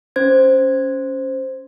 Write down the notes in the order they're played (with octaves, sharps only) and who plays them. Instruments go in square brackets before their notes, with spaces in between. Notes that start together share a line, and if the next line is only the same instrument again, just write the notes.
[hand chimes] C#4 C5 G#6